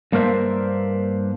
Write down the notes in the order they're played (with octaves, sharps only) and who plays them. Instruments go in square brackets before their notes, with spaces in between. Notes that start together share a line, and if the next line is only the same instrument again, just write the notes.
[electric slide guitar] G2 A#3 D4 A#4 C5 E5